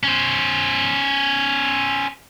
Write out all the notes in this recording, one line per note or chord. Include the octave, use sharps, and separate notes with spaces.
C#4 C5